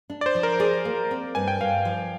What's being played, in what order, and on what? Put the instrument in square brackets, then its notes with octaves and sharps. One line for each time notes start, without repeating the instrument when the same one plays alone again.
[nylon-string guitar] D4
[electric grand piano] D5
C5
[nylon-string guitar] F3
[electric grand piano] A#4
[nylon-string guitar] G#4 [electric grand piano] D5
[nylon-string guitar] A#3
C4
[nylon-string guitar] G2 [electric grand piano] G#5
[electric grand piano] G5
[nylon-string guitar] G2 [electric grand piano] F5
[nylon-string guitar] F3